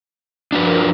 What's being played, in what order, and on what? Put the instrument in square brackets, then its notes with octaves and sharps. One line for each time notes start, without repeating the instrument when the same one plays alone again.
[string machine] F3 A#4 [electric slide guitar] D4 F#4 B4